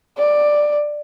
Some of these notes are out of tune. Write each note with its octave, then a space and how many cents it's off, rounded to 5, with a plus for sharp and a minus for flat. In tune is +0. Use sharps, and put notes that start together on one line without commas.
D5 +10